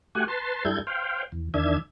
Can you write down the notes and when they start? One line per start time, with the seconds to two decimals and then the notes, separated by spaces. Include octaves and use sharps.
0.15 A3 F#4 G4 F#5 G#5
0.28 B4 A5 C6
0.65 G2 G3 E4 A4 G6 G#6
0.87 C5 F5 G5
1.32 E2
1.54 E2 D#3 D4 E5 G#6